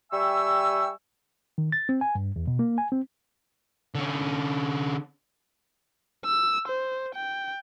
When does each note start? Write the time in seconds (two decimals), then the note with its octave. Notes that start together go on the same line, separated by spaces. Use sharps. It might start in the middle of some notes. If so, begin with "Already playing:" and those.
0.11 G3 E5 G5 G#5 C#6 E6
1.58 D#3
1.72 A6
1.89 C4
2.01 G#5
2.15 G2
2.36 E2
2.47 B2
2.59 A#3
2.78 G#5
2.92 C4
3.95 D3 C#4
6.26 E6
6.68 C5
7.15 G5